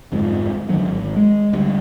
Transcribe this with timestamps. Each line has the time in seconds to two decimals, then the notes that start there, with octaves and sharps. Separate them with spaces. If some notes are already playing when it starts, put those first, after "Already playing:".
0.12 G1 F2 G#2 F3
0.69 D3 D#3 F#3 A3
0.85 G#1
1.16 G#3
1.53 D2 G3